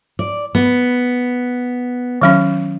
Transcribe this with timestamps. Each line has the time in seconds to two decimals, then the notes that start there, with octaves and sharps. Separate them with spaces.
0.19 D5
0.55 B3
2.21 D#3 F#3 C#4